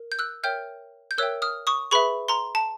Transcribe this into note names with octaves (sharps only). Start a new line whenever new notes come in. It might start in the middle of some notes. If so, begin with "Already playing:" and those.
Already playing: A#4
G6
E6 F#6
A#4 C#5 E5 G5 F6 G6
G6
A#4 C#5 E5 G5 E6 F#6
D#6 F6
C#6 D#6
G#4 B4 E5 B5 C#6
A#5 C6
A5